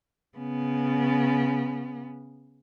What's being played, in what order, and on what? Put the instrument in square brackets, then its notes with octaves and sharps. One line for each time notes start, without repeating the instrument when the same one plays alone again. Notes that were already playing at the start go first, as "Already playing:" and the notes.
[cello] C#3 B3